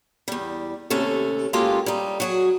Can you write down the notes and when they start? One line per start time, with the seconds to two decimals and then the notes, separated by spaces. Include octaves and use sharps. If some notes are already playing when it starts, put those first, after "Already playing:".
0.28 E2 G3
0.90 D#2 C3 A3 C#4 A4
1.53 G#3 A#3 C#4 F4 G4 A4
1.86 G3 D#4
2.20 F#3 F#4 G#4